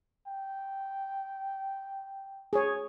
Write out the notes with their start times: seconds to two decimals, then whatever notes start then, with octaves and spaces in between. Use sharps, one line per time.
0.27 G5
2.53 G#4 C#5